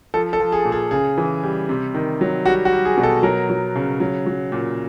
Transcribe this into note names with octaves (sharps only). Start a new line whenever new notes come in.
F3 A4
A4
F3
G#4
A#2
G#4
C#3 G#4
E3
G3
C3
D#3
F#3
G3 F#4
F#4
G3
G#4
B2
A4
F#3 A#4
F#3
C#3
F#3
F#3
A#2